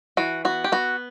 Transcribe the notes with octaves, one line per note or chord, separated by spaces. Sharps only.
E3 F#4
B3 F#4
G4
B3 F#4